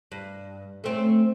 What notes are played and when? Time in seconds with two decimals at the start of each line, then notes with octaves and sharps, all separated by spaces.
0.12 G2
0.84 A3 C4 C#4